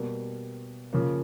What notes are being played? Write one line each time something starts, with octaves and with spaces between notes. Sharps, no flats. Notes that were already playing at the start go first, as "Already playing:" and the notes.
Already playing: B2 G3 A#3
C#3 F3 A#3